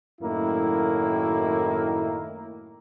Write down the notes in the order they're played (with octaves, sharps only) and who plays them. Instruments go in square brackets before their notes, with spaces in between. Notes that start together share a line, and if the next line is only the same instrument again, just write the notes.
[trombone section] F#2 A2 D#3 A#3 E4